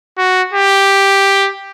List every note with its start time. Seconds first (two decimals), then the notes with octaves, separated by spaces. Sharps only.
0.18 F#4
0.53 G4